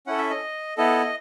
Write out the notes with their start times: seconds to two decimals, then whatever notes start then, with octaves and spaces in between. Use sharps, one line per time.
0.07 C#4 E4 A4 F#5
0.18 E5
0.30 D#5
0.77 B3 E4 A4 D#5